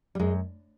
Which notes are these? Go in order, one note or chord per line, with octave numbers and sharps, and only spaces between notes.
G3
F#2 G#3